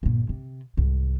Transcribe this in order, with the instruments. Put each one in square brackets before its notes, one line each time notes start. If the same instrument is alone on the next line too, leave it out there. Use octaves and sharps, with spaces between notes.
[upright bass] G1 A#2
C3
C2 G#2